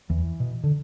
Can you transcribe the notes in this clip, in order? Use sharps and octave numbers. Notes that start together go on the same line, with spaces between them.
E2 E3
B2
D3